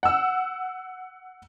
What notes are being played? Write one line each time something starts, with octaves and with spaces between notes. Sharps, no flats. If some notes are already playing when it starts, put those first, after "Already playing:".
F#5 E6